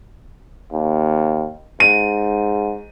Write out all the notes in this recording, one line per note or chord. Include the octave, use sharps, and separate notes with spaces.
D#2
G#2 D#7